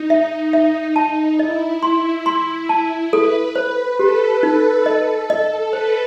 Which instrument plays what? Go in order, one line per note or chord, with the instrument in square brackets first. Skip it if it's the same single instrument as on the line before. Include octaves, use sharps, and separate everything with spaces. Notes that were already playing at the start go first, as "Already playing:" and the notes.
Already playing: [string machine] D#4
[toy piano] E5
E5
A5
[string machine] E4 [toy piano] D#5
[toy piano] C6
C6
A5
[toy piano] A4 [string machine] B4
[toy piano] C5
[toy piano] G4 [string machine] A4
[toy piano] D#4
D#5
D#5
[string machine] B4 [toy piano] C5